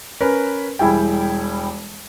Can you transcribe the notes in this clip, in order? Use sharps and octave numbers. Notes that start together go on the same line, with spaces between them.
C#4 A#4 B4
E1 G3 E4 G#4 G5